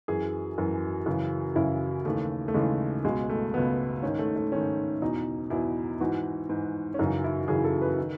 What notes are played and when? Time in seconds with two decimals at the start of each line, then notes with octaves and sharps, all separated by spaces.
0.08 F#2 E3 G#4
0.58 F#2 E3
1.06 F#2 C#3 E3
1.56 F#2 C#3 E3 E4
2.05 D#2 C#3 E3 A3
2.48 A3
2.54 D#2 C#3 E3 G#3
3.04 C#2 B2 G#3
3.29 A3
3.54 C#2 B2 B3
4.02 G#2 D#3 C#4
4.19 A3
4.36 A3
4.52 G#2 D#3 C#4
5.02 E2 B2 D#4
5.50 E2 B2 E4
6.00 G#2 E3 F#4
6.49 G#2 E3
6.94 C#4
6.99 F#2 C#3 E3 D#4
7.24 E4
7.48 F#2 C#3 E3 G#4
7.64 A4
7.82 B4
7.98 D#3